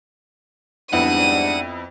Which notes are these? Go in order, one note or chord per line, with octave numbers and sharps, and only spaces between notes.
F2 G#2 G3 B3 D4 E4 F#5 D#7